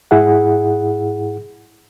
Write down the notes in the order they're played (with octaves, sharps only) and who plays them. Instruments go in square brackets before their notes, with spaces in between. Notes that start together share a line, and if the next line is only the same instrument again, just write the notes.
[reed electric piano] G#2 E4 G#4 F#5